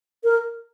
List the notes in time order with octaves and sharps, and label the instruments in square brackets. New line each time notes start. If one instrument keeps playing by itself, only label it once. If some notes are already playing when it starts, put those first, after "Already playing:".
[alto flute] A#4